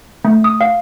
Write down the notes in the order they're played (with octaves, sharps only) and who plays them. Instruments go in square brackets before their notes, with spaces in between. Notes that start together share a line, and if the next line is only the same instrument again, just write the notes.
[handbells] A3
D#6
F5